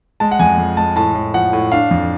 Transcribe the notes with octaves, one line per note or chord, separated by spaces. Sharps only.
G#3 A5
F#5
F2 G#5
F2
G#3 A5
A2 A5
A2
F3 F#5
A2
D4 F5
F2